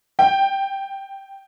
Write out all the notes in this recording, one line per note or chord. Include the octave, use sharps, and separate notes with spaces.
G5